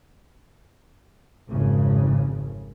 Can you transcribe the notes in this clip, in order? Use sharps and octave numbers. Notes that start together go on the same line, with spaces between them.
G#1 F2 C#3